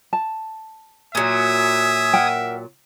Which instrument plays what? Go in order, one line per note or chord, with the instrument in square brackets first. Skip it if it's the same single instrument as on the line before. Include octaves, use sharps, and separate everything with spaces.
[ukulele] A5
[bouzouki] A#2 F#3 [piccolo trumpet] E5 [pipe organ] G#5 D#6 G#6
[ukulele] A#4 F#5 G5